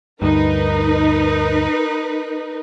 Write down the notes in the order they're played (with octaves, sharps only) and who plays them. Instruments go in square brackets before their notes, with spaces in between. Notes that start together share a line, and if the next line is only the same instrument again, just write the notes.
[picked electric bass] D2 G2 [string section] D#4 A#4 B4